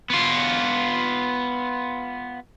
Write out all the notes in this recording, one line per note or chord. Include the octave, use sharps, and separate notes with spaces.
B3 F4